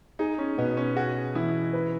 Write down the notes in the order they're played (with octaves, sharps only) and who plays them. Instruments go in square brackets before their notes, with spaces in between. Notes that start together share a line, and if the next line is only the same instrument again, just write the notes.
[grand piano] D#4 [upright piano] G#4
[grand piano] C#4
[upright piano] B2 [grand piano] B3
[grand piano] C#4
[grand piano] F#4 [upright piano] G#4
[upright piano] E3 [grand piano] E4
[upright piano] B4